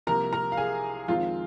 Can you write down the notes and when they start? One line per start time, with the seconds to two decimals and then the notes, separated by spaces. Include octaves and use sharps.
0.07 C2 C3 F3 A#3 A#4 A#5
0.33 A#4 A#5
0.52 F5
0.57 G#4 G#5
1.08 F2 D#3 G#3 C4 F4 F5